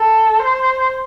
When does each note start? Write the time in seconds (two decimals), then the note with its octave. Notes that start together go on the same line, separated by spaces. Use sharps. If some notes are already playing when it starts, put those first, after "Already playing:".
Already playing: A4
0.40 C5